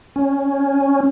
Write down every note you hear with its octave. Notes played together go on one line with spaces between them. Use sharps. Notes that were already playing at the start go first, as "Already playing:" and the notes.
C#4